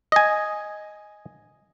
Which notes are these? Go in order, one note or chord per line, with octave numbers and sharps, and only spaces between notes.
D#5 G#5